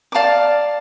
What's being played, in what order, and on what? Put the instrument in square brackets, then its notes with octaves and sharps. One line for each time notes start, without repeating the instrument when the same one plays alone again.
[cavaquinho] D5 F5 A5 D6